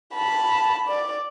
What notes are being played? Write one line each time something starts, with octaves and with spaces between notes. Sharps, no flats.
A5 B5
D5